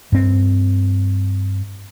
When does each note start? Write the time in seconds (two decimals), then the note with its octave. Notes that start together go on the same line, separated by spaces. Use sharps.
0.12 G2 C4